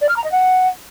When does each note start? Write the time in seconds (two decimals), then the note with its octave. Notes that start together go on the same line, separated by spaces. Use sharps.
0.01 D5
0.09 F6
0.17 A#5
0.24 D#5
0.32 F#5